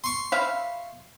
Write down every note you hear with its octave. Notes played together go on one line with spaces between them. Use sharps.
C6 C#6
E5 F5 B5